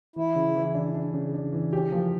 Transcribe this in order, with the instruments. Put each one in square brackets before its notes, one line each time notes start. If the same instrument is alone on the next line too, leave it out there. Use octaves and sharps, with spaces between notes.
[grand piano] E3 [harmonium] E4
[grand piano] C#3
E3
D4
D4
C#3
D4
E3
[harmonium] C#4 [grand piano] G4
[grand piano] F3 [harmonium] A#3